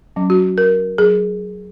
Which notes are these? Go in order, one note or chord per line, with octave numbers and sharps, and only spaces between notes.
F#3 C#4
F#4
A#4
F#3 G#4